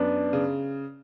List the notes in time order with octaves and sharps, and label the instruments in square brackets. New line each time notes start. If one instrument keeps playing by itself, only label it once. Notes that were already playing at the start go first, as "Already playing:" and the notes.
Already playing: [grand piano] F#2 [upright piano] B3 D4
[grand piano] C#3